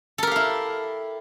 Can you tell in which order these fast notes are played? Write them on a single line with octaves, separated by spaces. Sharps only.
A4 A#4 G4 F5 E4